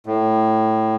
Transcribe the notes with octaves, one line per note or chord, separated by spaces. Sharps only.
A2